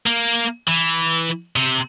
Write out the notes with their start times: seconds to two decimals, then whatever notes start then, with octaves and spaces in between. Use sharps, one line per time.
0.06 A#3
0.68 E3
1.56 C3